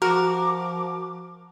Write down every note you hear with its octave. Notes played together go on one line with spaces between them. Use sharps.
F3 F#4 A#4 D6